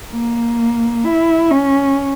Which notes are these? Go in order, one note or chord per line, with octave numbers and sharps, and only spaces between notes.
A#3
E4
C#4